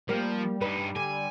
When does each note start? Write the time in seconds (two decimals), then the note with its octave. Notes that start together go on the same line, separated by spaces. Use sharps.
0.09 F3 G3 A#3
0.61 G2 D#4 B4
0.96 D3 G#5